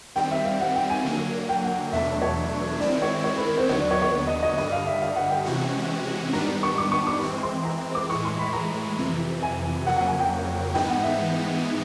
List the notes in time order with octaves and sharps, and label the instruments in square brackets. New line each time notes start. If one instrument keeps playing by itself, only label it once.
[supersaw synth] D#3 G3 C4 [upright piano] G5
[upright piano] E5
F5
F#5
G5
G#5
[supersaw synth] D3 F#3 A#3
[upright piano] G5
F#5
[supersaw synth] E2 B2 F#3 A3 D4 [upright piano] E5
[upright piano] C#5
[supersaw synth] D#3 G#3 C4 E4 [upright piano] D5
[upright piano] C#5
C#5
B4
A#4
C5
[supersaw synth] D#2 D3 F#3 B3 [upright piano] C#5
[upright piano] D5
C#5
C#5
C#5
D#5
D#5
[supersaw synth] G2 D3 G3 [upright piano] D#5
[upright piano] F5
E5
F5
F#5
G5
[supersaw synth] C3 E3 G#3 C#4 F#4
[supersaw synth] G#2 D#3 G3 B3 D4 [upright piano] A#5
[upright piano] C#6
D6
C#6
D6
[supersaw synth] E3 G#3 C4
[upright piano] C6
A#5
D6
[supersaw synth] A2 E3 G#3 [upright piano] C#6
[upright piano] C6
B5
A#5
[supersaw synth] F2 C3 E3
[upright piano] G#5
[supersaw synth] F2 C#3 F#3 A#3 [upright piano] F#5
[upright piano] F#5
G#5
G5
[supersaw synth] G#2 E3 G#3 B3 D#4 [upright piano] G5
[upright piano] F#5
E5